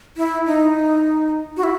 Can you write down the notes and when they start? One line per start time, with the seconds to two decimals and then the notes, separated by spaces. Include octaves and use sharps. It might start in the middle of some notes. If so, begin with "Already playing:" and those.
0.17 E4
0.46 D#4
1.57 F#4
1.63 E4